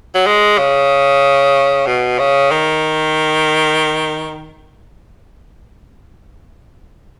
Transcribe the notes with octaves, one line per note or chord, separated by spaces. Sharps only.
F#3
G#3
C#3
B2
C#3
D#3